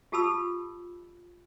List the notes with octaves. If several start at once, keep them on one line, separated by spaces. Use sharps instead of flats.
F4 G4 A4 A5 B5 E6